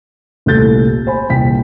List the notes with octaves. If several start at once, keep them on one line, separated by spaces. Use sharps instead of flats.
D#1 C2 A2 A4 G6 A6
C5 G#5 B5
D#1 C2 G5 G#5 B6